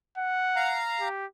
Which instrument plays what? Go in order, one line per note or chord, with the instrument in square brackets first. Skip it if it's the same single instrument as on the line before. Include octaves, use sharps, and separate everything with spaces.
[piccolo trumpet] F#5
[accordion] F5 A#5
[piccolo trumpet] G4